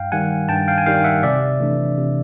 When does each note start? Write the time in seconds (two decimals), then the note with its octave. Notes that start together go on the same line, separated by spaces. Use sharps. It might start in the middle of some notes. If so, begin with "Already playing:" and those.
Already playing: G2 F5 G5
0.12 D#3 G3 F#5 G#5
0.49 G2 G5 A5
0.68 F5 G5
0.78 G#5
0.86 D#3 G3 F5 G5
1.04 E5 F#5
1.23 C3 D5 E5
1.60 E3 A3 D4
1.98 C3